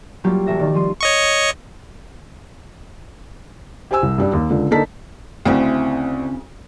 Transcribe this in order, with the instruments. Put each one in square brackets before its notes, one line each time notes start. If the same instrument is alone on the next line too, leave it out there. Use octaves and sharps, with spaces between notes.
[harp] F#3 G3 A#3 F4 G4
E1 E5 A#6
D#3 D5
F3 G3 C6 D#7
[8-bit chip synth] C#5 D#5 C#6
[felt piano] G4 C5 G#5 E6
C2
G2 G3 D4
D#2
C#2 D3
D3 A#3 D#4 A4 A5 B6
[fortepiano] D2 [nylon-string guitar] C#3 C4 E4